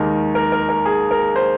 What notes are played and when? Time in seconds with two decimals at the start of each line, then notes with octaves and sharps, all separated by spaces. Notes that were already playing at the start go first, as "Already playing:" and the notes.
Already playing: D#2 D#3 G#3 A#4
0.35 A#4
0.52 A#4
0.69 A#4
0.86 G#4
1.11 A#4
1.36 C5